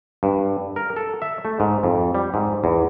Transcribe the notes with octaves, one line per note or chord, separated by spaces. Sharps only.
G2
A#4
A4
E5
A3
G#2
F2
G3
G#2
E2